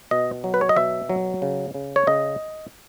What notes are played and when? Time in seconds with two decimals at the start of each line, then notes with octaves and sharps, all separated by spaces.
0.11 B2 D#5
0.44 F#3
0.54 B4
0.61 C#5
0.69 D#5
0.76 B2 E5
1.09 F#3
1.42 C#3
1.74 C#3
1.96 C#5
2.07 C#3 D#5